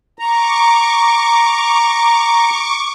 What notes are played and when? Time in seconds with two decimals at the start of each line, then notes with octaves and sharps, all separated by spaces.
0.19 A#5 C#6 D6